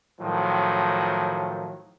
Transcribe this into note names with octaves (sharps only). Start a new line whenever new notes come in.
A2 D#3 F3 F#3